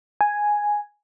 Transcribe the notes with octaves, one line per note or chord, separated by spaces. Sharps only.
G#5